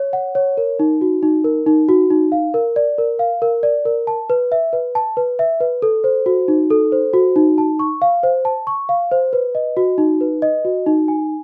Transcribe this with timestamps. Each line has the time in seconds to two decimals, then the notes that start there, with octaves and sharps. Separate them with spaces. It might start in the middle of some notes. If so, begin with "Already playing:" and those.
Already playing: C#5
0.13 F#5
0.35 C#5
0.57 A#4
0.79 D#4
1.01 F#4
1.23 D#4
1.44 A#4
1.66 D#4
1.89 F#4
2.10 D#4
2.32 F5
2.54 A#4
2.76 D5
2.98 A#4
3.19 F5
3.42 A#4
3.63 D5
3.85 A#4
4.07 A5
4.30 B4
4.52 E5
4.73 B4
4.95 A5
5.17 B4
5.39 E5
5.60 B4
5.82 A4
6.04 C5
6.26 F#4
6.48 D#4
6.70 A4
6.92 C5
7.13 F#4
7.36 D#4
7.58 A5
7.79 C#6
8.02 F5
8.23 C5
8.45 A5
8.67 C#6
8.89 F5
9.11 C5
9.33 B4
9.55 D#5
9.77 F#4
9.98 D#4
10.21 B4
10.42 D#5
10.65 F#4
10.86 D#4
11.08 G#5